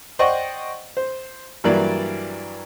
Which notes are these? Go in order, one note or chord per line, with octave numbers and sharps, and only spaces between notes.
C5 D5 D#5 F#5 G5 C#6
C5
G2 E3 F#3 A#3 D5